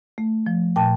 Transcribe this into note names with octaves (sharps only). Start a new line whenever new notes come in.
A3
F3
A#2 G5 A5